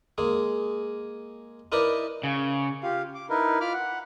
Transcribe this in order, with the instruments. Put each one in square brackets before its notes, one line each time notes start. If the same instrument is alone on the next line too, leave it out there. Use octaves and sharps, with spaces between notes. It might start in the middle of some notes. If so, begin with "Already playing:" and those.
[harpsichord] G#3 A#3 G#4
D#4 E4 A#4 B4 D5 D#5
[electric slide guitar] C#3
[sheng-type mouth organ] F4 G4 F5
D6
D#4 E4 A#4 B4
F4 B5 D6 F6
F#5